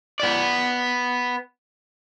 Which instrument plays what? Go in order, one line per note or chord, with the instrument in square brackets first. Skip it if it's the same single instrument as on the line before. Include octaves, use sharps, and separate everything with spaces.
[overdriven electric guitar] B3 D5